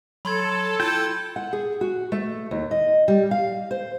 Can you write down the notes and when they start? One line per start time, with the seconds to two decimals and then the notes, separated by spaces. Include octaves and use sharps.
0.25 F#3 A4 B5 C6 G#6
0.80 E4 F4 G5
1.36 F#5
1.53 G#4
1.81 F#4
2.12 A3
2.51 D#2
2.71 D#5
3.08 G3
3.31 F5
3.71 C5